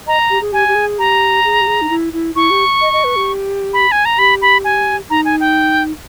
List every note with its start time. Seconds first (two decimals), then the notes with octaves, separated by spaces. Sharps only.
0.07 D#5 A#5
0.30 G4
0.41 G#4
0.52 G4 G#5
0.68 G4
0.75 G#4
0.99 G4 A#5
1.44 G#4
1.61 G4
1.67 G#4
1.82 D#4
1.90 E4
2.13 E4
2.35 E4 C#6
2.50 G4
2.81 D#5
2.93 D#5
3.04 B4
3.16 G4
3.73 B5
3.92 G#5
4.05 A#5
4.18 G4 B5
4.42 B5
4.64 G#5
5.10 D#4 A#5
5.25 G#5
5.40 G5